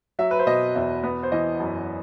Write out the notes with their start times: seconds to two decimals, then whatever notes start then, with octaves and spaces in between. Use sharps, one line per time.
0.19 F#3 E5
0.31 B4
0.39 C5
0.47 B2 D#5
0.75 E2 E5
1.03 B3
1.23 C5
1.32 E3 D#5
1.60 F#2